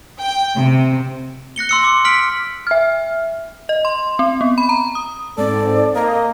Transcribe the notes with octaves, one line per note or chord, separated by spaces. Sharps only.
G5
C3
F#6 A#6 C#7 G7
C6 E6 C#7
D6
F6 B6 D7 F#7
E5 F6
D#5
C6
C4
B3
B5
A#5
D#6
G#2 C4 A4 D5
A#3 D#5 A#5